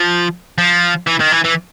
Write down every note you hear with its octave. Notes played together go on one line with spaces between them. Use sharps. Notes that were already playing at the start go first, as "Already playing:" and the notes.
Already playing: F3
F3
E3
D#3
E3
E3